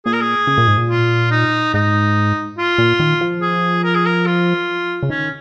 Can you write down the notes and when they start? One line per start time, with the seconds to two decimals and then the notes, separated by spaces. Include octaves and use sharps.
0.05 A#2 G#4
0.13 A#4
0.21 G#4
0.47 C#3
0.58 A#2
0.67 G#2
0.77 A#2
0.90 F4
1.31 D#4
1.74 G#2 D#4
2.58 F4
2.78 A#2
3.00 D#3
3.21 F3
3.41 G#4
3.84 A#4
3.95 G#4
4.06 A#4
4.26 F4
5.03 C#3
5.10 D#3 C#4